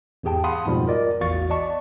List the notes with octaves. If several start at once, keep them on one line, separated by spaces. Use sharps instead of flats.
E2 G#2 G4 G#4 G5 A5
F5 F#5 A5 B5 C6 D#6
F2 G#2 B2 F3 G3
F4 A#4 D5 D#5
A1 E2 F#4 F5 C#6 A6
D5 D#5 A5 C#6